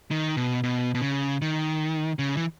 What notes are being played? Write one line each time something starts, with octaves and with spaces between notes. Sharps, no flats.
D#3
B2
B2
B2
C#3
D#3
C#3
E3